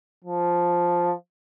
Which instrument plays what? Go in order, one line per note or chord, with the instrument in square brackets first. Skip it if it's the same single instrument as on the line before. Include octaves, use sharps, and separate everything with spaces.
[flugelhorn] F3